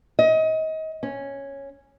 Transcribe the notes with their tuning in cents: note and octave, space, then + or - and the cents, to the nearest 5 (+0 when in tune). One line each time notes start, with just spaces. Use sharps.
D#5 +30
C#4 -5